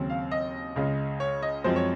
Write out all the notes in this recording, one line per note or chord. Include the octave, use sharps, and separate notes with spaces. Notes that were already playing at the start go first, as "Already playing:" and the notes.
Already playing: D#2 C#3 F#3 C4
F5
D#5
C#2 C#3 G#3
C#5
D#5
F#2 F3 G#3 C4 C5
C#5